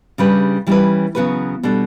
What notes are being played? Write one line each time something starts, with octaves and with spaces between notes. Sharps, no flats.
C#3 G3 D4 G4 B4
E3 G3 C#4 E4 B4
C#3 F#3 B3 F#4 B4
B2 G3 D4 A4